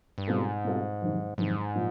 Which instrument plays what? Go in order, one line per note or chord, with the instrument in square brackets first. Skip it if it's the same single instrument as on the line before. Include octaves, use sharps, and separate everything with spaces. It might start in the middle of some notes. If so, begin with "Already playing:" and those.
[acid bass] G2
[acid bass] G#2 [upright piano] B2 G3 C4 F4 A4
[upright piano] B2 G3 C4 F4 A4
F#1 F2 C3 D#3
[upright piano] F#1 F2 C3 D#3 [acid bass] G#2
[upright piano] A#2 F3